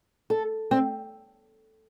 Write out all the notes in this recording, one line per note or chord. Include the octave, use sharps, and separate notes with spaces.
A4
C4